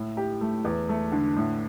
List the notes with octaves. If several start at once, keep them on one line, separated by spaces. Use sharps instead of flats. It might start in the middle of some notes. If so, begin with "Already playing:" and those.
Already playing: A2 E4
G4
A3
E2
A3
D3
A2